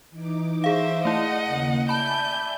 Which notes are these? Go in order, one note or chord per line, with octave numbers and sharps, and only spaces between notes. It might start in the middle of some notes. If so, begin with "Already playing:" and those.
E3 D#4 D6
G#4 C5 E5 F5
A3 E4 D#5 F#5
D#2 C#3 A#3
D5 E5 G#5 A5 B5 G6